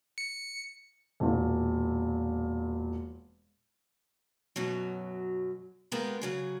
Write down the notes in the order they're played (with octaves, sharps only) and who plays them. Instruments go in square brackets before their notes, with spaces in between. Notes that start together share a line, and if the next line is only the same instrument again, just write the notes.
[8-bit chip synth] C#7
[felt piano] E1 A#2
[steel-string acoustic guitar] F#2 B2 F#3
G#3 B3 F4 G4 A#4 B4
C#3 F#3 G#4